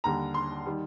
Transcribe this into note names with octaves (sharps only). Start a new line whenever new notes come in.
D#2 D3 G3 A#5
C6
D#3 G3